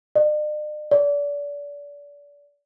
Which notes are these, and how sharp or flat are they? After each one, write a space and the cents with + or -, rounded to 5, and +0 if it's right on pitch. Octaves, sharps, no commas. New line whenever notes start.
D5 +45
D5 -30